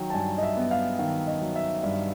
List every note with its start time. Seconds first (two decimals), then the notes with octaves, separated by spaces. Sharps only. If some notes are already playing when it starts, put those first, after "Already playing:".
Already playing: D#3 F#3 G5
0.10 A5
0.14 G2 G#5
0.38 D#5
0.43 E5
0.57 B3
0.71 F5
0.99 D#3 F5
1.27 D#5
1.42 F#3
1.56 E5
1.83 G2